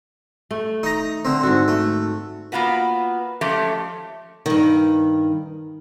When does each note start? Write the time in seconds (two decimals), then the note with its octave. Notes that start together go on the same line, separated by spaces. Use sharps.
0.51 A3
0.83 D#4 A#5
1.25 D3 C4
1.43 G#2 F#4
1.68 A3
2.52 A#3 B3 F4 F#4 B4
3.41 F3 G#3 A3 C#4 G4
4.46 G2 D#3